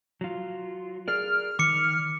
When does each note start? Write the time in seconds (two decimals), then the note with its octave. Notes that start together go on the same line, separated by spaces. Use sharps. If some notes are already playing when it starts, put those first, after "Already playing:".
0.21 F#3 F4
1.08 G#4 A#4 D5 F6
1.59 D#3 D6 C#7